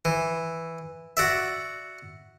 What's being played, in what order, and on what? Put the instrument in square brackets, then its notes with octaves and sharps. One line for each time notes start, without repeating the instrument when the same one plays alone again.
[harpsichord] E3
F#4 D5 E5